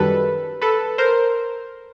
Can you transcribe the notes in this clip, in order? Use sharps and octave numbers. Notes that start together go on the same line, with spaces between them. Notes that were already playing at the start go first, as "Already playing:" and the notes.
Already playing: F#2 D#3 G3 A4 B4
A4 B4
A#4 C5